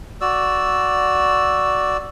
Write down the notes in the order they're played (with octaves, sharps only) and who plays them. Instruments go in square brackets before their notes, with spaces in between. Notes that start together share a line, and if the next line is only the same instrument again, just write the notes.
[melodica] F#4 D5 E6